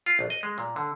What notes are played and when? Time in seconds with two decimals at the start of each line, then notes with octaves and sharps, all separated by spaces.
0.06 F4
0.19 A#1
0.30 D#5
0.43 G#3
0.58 A#2
0.76 D3